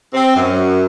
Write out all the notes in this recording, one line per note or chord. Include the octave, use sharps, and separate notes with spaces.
C4
F#2